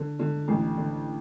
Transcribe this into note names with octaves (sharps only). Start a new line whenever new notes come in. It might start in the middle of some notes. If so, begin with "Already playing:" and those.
Already playing: D3
D3
A1
D3